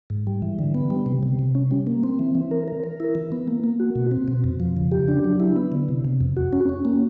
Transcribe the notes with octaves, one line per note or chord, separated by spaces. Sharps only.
G#2
G3
E3
D3
B3
G3
C3
C3
C3
C#4
G3
A#3
C4
E3
E3
A#4
A#4
A#4
E4
E3
B3
A#3
A#3
F#4
B2
C4
B2
F2
F3
C#3
G4
D4
F#3
E4
B3
D3
C3
C3
F2
F#4
C#4
C#4
A#3